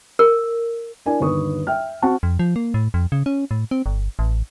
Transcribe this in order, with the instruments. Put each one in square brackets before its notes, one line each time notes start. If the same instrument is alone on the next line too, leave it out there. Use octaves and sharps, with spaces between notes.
[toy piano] A#4
[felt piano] D4 E4 A#4 D5 G#5
G1 D#2 B4 C#6 D#6
E5 G5 F6
C4 F#4 F#5 A5 C#6
[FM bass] F2
F3
A#3
A2
F2
C#3
C#4
A2
C4
G1
A1